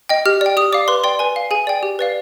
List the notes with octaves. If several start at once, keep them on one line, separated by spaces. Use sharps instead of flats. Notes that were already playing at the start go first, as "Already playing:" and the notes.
D#5 G5
G4 F6
D5 G5
G4 D#6
D5 F5 D6
B4 C6
D5 G5 C6
B4 G#5
F5
G#4 G#5
D5 G5
G4
B4 D5 F5